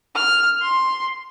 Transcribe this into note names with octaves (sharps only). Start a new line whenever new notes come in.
F6
C6